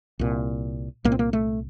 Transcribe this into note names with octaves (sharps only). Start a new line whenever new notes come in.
C2 A#2
C2 A#2 A#3
C4
A#3
A3